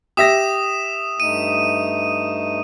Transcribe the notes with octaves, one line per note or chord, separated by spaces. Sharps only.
G4 E5 D#6 A#6 E7
G2 A3 D#4 D#7